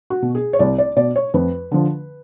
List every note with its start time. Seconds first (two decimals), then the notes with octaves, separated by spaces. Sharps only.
0.10 F#4
0.22 B2
0.35 G#4
0.53 C#5
0.59 C2 D5
0.78 D5
0.97 B2 D5
1.16 C#5
1.34 F2 B4
1.71 D3 F3